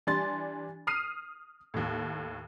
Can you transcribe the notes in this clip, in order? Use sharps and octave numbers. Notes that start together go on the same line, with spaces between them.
E3 G3 D4 C6 A6
D#6 F6 C7 D#7
D#2 A2